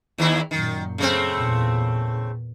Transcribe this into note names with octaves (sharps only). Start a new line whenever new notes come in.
D#2 D#3 E4
F#2 A#2 D#3
C#3 A3 C4
E2 A#2